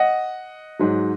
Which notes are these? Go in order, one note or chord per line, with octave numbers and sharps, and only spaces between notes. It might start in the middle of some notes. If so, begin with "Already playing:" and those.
Already playing: D#5 F#5
G#2 F#3